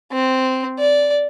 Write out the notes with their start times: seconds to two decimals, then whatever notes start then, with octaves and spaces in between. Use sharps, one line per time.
0.12 C4
0.79 D5